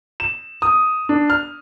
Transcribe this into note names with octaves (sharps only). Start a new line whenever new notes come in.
E7
D#6
D4
F6